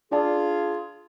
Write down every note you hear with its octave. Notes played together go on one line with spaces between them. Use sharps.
D4 F4 G#4 D5 A5